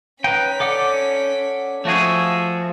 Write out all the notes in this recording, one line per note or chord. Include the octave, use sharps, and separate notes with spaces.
C#4 D#4 B4 G5 B6
A4 D5 F#5
F3 A3 F#4 G#4 E5